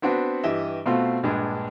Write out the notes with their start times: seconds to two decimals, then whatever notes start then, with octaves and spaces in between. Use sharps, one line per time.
0.02 B3 C4 D4 F#4 B4
0.43 G2 E3 G4 D#5 E5
0.86 B2 A3 C4 F4 F#4
1.23 A#1 G2 G#3 D4